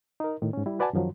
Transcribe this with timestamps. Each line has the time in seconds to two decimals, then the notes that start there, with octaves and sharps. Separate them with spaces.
0.20 D#4 A#4
0.42 A2 D#3
0.53 G#2 C#4
0.66 G3 E4
0.79 F#4 B4 D5 F#5 G#5 A5
0.93 F#2 D#3 F3 F#3